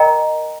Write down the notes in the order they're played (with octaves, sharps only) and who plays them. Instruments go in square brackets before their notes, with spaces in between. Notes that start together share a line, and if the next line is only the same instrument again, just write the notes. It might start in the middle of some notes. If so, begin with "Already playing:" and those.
Already playing: [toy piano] A#4 D#5 G5 A#5